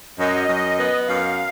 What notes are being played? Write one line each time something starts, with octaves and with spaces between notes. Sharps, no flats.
F#2 D#5
F#2
B3
F#2 F5